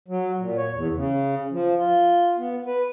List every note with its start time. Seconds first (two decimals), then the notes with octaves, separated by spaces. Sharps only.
0.08 F#3
0.39 A#2
0.57 C#5
0.73 E2
0.95 C#3
1.52 F3
1.77 F4
2.38 B3
2.67 B4